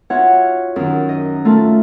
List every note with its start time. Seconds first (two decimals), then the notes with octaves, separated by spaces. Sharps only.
0.10 F4 F#4 C#5 E5 F#5
0.76 F#2 D#3
1.09 D#5
1.45 A3 F4